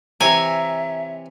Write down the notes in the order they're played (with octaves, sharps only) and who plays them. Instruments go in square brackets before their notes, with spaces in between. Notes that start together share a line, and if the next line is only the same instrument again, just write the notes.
[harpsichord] C3 E3 C#5 [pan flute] E5 [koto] G#5 [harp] A#5 E6 C#7